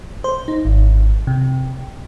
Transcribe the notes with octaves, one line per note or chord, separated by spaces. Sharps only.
C5
D#4
G#1
C3